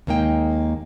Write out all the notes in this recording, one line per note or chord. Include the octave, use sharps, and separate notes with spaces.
D#2 G#3 A#3 D#4 G5